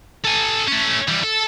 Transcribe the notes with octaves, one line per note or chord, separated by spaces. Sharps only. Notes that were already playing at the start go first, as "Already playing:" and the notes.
A4 G#5
A3 C#4
E3 G3
A4